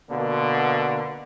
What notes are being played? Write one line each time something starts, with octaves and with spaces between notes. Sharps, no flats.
B2 D3 A#3